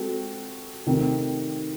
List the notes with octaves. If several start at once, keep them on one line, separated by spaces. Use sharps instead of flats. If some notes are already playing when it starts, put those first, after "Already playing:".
Already playing: G#3 C4 F#4 A4
C3 D#3 A3 C4